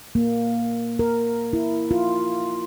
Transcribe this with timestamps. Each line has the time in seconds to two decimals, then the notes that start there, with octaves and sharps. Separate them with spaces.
0.15 A#3
0.99 A#4
1.53 E4
1.91 F4